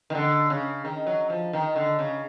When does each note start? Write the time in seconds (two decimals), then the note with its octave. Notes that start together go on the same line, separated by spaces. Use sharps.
0.10 D#3
0.15 D3
0.50 C#3
0.85 D#3
1.07 F#3
1.30 F3
1.53 D#3
1.76 D3
1.99 C#3